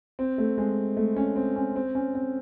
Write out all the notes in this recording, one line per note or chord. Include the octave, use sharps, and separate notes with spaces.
C4
A3
G#3
A3
C#4
C4
C#4
C4
C#4
C4